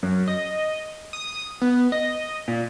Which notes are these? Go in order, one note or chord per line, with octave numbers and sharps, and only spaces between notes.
F#2
D#5
D#6
B3
D#5
A#2